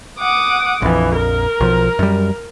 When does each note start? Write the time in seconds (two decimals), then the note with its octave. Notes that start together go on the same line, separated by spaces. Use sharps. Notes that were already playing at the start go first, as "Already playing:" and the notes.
0.19 F#5 D6 D#6
0.82 A#1 F2 E3
1.16 A#4
1.60 B1 F3
1.99 F#2 G3